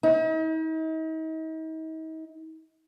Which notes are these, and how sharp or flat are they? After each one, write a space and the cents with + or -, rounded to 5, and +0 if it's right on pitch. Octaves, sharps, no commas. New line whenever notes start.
D#4 +40